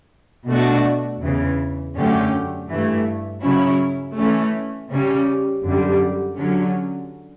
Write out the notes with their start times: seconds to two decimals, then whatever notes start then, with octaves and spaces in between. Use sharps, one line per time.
0.48 B2 A3 D4 F#4
1.22 E2 C#3 E3
1.95 F#2 D3 A3 C#4 G4
2.69 G2 E3 A3
3.43 C#3 F#3 C#4 E4
4.17 E3 A3 C#4
4.90 C#3 G3 C#4
5.64 F#2 D3 G3
6.38 D3 F#3 C#4